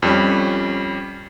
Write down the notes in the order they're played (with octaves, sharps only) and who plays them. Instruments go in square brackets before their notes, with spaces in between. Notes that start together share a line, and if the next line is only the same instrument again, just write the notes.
[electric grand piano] F2 G3 C#4